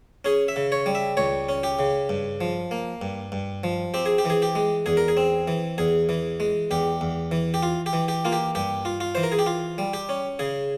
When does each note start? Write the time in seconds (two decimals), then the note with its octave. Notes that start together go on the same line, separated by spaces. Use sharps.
0.25 C#4 G#4
0.48 E5
0.56 C#3
0.72 C#5
0.86 G3
0.95 E5
1.17 C#2 C#5
1.49 C#4
1.63 G4
1.79 C#3
2.09 G2
2.41 F3
2.71 A#3
3.02 G2
3.32 G2
3.64 F3
3.94 C4 G4
4.06 G#4
4.18 G4
4.25 E3 G#4
4.42 G4
4.55 G#3
4.86 E2 G#4
4.97 A#4
5.08 G#4
5.17 C4
5.48 E3
5.78 E2 G#4
6.09 E3
6.40 G#3
6.71 E2 G4
7.01 E2
7.31 E3
7.54 G4
7.63 F4
7.86 G4
7.93 E3
8.08 G4
8.25 A#3 F4
8.32 G4
8.55 G2 G4
8.85 F4
9.00 F4
9.15 E3 C5
9.23 A#4
9.32 G#4
9.39 G4
9.46 F4
9.78 G3
9.94 G4
10.09 C#4
10.39 C#3 G#4